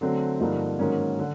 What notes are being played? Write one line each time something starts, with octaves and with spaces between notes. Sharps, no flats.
D3 F#3 A3 C4
G2 D3 F3 A#3 D#4
G#2 D#3 F#3 A#3 C#4
D3